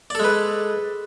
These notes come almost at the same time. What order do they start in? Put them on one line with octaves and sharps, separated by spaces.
D5 A4 G#3 B4